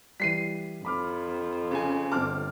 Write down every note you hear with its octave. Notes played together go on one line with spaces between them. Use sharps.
E3 G3 B6 C7 D#7
F2 B5 D6 F6
C#3 G#5
G1 C4 A5 D6 F6